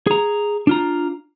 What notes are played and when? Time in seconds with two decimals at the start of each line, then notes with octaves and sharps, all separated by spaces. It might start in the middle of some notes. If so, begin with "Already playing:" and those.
0.07 G#4 A#5
0.67 D4 F4 A#5